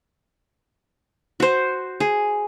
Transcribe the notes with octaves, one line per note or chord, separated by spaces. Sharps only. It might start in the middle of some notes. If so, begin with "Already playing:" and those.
F#4 C5
G#4